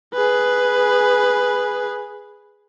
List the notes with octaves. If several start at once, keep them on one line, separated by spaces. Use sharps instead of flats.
G#4 B4